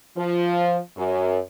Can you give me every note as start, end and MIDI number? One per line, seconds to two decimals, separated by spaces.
0.16 0.77 53
0.96 1.39 42